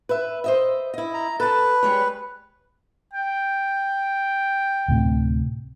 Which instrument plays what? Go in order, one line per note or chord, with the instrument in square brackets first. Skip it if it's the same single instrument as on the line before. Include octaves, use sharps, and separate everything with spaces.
[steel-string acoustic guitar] B4 E5
C5 D#5 E5
E4 D#5
[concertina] A#5
[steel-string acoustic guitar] A4 A5 [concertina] B4
[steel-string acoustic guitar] G3 G#3 C#5
[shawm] G5
[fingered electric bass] D2 A2 C3